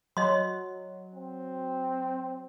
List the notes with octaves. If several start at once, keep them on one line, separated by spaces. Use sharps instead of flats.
F#3 D#5 C6
C4